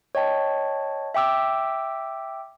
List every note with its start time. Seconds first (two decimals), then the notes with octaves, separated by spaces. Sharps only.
0.15 C#5 D#5 G5 A5
1.14 E5 G5 D6 E6